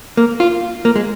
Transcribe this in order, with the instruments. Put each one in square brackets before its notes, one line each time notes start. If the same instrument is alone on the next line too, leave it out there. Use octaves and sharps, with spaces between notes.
[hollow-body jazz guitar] A#3
F4
A#3
G#3